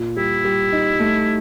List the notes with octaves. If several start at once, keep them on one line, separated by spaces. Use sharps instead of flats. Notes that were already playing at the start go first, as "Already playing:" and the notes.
Already playing: A#2
G3 E4
G3
D#4
A3